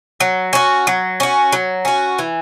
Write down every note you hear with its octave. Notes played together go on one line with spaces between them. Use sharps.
F#3
C#4 F#4
F#3
C#4 F#4
F#3
C#4 F#4
E3